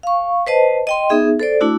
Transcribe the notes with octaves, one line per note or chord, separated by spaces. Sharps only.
F5 C#6
B4 C5 D#5 A5
D#5 G5 C6
B3 D#4 G#4 E5
A4 C5 D5
A3 D4 E4 F#4